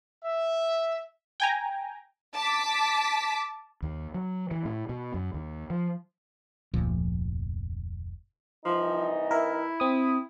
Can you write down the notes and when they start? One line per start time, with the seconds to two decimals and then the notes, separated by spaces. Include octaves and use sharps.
0.24 E5
1.40 G5 G#5 A#5
2.34 A5 D6 B6
3.82 D#2
4.14 F#3
4.51 E3
4.65 A2
4.89 B2
5.14 F#2
5.34 D#2
5.70 F3
6.74 F1 D2 A#2 F3
8.65 C2 E3 F3 D#4
9.31 E4 A#4 E5
9.80 C4 D#6